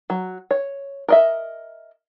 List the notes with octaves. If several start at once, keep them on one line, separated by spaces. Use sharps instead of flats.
F#3
C#5
A#4 D#5 E5